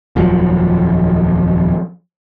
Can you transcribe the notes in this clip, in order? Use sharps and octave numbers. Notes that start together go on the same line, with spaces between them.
D#1 F2 F3 F#3